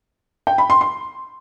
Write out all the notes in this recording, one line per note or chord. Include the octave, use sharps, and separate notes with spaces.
G5
B5
C6
C6